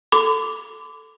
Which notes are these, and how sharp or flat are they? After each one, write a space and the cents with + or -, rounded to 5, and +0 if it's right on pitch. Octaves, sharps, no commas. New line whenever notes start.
A4 +0 B5 +45 D6 -10